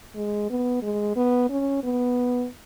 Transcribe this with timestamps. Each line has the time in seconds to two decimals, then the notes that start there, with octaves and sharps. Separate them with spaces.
0.15 G#3
0.50 B3
0.83 G#3
1.16 B3
1.50 C#4
1.84 B3